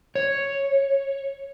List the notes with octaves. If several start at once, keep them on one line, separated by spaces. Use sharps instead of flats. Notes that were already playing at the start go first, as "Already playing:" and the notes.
C#5